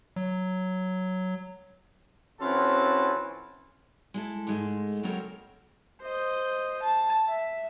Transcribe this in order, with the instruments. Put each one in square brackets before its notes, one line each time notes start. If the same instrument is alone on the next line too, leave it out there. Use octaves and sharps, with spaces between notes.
[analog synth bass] F#3
[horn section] E3 C4 C#4 F4 F#4 A4
[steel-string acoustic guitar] G#3 E4 A4
G#2 G#3 A3
C#3 F#3 C4 A4 A#4 C#5
[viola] C5 D#5
A5
E5